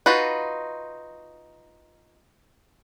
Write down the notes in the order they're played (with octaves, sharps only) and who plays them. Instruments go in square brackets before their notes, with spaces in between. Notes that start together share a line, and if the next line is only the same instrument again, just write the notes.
[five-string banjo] D#4 F4 F#4 B4